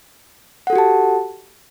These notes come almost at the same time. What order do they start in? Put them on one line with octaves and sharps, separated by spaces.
F#5 A4 F#4 G4 A5